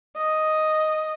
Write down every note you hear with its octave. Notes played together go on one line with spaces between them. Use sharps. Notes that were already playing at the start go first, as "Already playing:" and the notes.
D#5